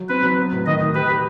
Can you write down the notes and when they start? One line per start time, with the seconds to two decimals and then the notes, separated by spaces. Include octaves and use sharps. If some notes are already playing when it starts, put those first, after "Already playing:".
Already playing: F#3
0.09 C4 B4
0.23 F#3
0.38 B3
0.52 A2
0.66 D#3 D#5
0.81 D#3
0.95 G4 B4
1.08 G4